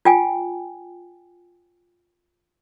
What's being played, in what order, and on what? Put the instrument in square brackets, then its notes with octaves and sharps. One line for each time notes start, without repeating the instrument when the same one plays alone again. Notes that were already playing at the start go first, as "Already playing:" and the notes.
[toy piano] F4 G5 G#5